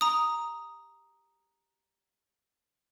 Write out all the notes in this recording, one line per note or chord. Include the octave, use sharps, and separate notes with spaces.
A#5 D#6